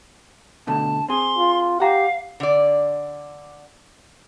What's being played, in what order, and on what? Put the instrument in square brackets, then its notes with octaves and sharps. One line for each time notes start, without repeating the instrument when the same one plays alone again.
[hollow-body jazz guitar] B2 D3 A3 [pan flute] A5
[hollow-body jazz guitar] C4 G#4 [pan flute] C6
[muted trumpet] F4
[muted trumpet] G4 [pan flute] F5 [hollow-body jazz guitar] F#5 A#5
[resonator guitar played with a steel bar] D3 D5